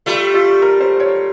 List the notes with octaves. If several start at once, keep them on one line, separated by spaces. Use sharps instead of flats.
G3 A3 F4
F4
A#4
C5
C#5